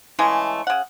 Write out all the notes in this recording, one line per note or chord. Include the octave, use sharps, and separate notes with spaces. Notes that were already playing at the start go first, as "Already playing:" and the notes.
C#3 E3 G#3 A3
C#3 F#5